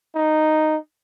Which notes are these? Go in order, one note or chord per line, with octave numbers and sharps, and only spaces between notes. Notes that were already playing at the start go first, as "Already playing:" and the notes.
D#4